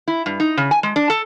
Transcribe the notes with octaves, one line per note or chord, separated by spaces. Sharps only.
E4
G2
D#4
C#3
G#5
G#3
D4
A4